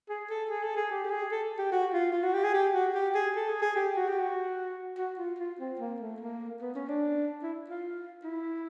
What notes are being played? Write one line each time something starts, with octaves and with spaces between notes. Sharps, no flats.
G#4
A4
G#4
A4
G#4
G4
G4
G#4
A4
G4
F#4
F4
F4
F#4
G4
G#4
G4
F#4
G4
G#4
A4
G#4
G#4
G4
F#4
G4
F#4
F#4
F4
F4
C4
A#3
A3
A#3
B3
C#4
D4
E4
F4
E4